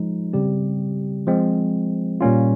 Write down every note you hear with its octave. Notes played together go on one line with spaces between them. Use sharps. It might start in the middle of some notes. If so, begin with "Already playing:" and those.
Already playing: F3 G#3 D#4
C#3 G3 C4 G4
F3 G#3 C4
A#2 G3 A#3 C#4 F4